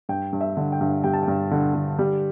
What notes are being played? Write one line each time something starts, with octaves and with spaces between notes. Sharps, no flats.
G2 G5
G2
E5
D3
G5
G2
G3 G5
A5
G2 G5
D3
D3
G3